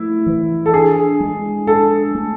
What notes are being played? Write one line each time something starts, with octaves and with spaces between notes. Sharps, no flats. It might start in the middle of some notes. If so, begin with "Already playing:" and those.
Already playing: A3 E4
E3
A4
D4 G#4
G#3
D4 A4
A3